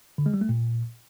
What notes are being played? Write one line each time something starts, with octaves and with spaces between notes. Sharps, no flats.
D3
G#3
G3
A3
A#2